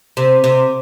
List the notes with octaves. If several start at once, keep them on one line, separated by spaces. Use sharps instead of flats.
C3
C3